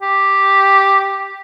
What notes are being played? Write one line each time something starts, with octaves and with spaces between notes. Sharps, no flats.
G4